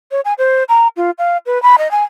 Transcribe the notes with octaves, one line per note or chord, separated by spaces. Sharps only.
C#5
G#5
C5
A#5
F4
F5
B4
B5
D#5
G#5